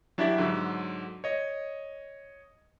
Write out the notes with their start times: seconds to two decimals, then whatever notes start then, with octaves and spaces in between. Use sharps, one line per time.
0.18 F#3 D4 E4 G4 D5 E5
0.38 G#2 D3 F#3
1.24 C#5 D#5